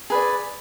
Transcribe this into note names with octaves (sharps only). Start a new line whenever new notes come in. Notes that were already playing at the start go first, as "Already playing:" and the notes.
G#4 B4 D5